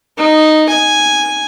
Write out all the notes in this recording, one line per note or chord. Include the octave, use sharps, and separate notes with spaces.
D#4
G#5